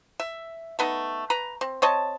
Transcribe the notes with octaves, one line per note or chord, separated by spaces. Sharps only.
E5
A3 B3 D#4
B4 A#5
C4
C4 C#5 D#5 A5